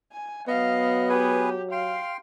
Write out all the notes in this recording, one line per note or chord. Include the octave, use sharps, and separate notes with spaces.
G#5
F#3 B3 D#5 F5
G4 G#4 B4 G#5
F5 G5 C6